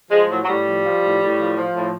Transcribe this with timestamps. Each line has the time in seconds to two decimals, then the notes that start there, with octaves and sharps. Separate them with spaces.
0.11 F3 G#3
0.29 A2 F#3
0.43 F#3
0.47 A2 G3
0.67 F3
0.85 F3
1.03 A2
1.21 A2
1.39 F3
1.57 F3
1.75 A2